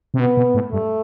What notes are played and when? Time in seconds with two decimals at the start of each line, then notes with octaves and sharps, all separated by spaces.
0.14 C3
0.20 B2 B3
0.37 B2
0.54 A2
0.72 G2 A3